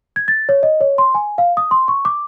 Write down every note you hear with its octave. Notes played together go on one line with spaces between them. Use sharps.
G#6
A6
C#5
D#5
C#5
C6
G#5
F5
D#6
C6
C#6
D6